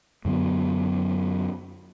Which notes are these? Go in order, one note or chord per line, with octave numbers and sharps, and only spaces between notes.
F#2 D3 F#3 B3